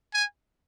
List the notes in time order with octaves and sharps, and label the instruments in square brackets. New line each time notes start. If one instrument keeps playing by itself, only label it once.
[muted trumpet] G#5